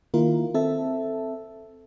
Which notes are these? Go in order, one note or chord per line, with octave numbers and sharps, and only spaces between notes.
D#3 A#3 E4 F4 A#4
C4 A4 E5 A5